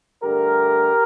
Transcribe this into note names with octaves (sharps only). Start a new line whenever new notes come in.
G2 D3 A3 G4 A#4